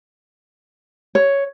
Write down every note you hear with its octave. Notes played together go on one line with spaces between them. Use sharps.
C#5